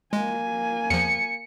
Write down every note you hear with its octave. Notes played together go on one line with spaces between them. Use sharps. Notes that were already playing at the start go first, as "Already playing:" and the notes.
G#3 A#3 G#5
E2 F3 C#7